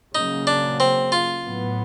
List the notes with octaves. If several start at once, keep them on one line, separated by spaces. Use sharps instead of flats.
C#3 F#3 A#3 D#4
D4
C4
F4
A2 F#3 B3